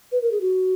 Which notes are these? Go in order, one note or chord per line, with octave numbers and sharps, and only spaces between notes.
B4
A#4
G#4
F#4